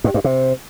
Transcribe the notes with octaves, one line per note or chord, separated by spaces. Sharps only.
G2
G2
C3